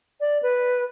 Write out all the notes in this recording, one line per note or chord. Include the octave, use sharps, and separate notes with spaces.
D5
B4